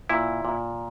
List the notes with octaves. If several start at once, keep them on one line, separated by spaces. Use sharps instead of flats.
A#2 E4
A#2